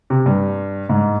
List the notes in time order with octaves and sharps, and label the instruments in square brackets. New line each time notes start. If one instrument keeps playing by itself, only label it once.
[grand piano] C3
G2
G#2